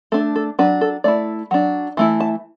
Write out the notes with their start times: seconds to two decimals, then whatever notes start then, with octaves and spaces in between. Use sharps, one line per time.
0.12 A3 D4 A4
0.36 A4
0.59 F#3 D4 B4
0.81 A4
1.04 A3 E4 D5
1.51 F#3 D4
1.97 E3 A3 E4
2.20 A5